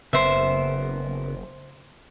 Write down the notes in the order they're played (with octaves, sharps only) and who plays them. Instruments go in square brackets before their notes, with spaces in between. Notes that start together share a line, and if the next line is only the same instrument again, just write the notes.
[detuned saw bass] F#1 [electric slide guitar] C#3 B3 A#4 [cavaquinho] C5 E5